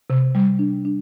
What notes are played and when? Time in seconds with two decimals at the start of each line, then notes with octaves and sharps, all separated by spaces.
0.10 C3
0.35 G3
0.59 D4
0.85 D4